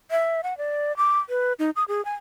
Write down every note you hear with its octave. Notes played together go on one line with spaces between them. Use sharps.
E5
F#5
D5
D6
B4
D#4
D#6
G#4
G#5